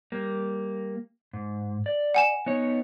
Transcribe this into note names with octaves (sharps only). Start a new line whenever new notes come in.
G3 A#3
G#2
D5
F#5 G#5 E7
B3 D#4 C#5